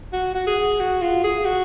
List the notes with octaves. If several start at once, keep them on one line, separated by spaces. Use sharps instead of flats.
F#4
F#4
G#4
F#4
F4
G#4
F#4